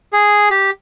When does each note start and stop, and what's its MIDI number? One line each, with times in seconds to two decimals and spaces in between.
0.13 0.49 68
0.51 0.70 67